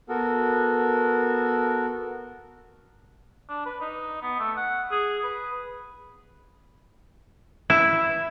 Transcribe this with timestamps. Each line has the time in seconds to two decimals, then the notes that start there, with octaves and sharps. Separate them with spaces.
0.09 B3 F#4 A4 A#4
3.49 D4
3.66 B4
3.81 D#4
4.22 B3
4.39 A3
4.57 F#5
4.91 G#4
5.24 B4
7.70 E4